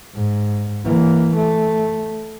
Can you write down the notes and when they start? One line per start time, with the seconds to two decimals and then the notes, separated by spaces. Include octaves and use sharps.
0.14 G#2
0.85 E3 A#3
1.36 A3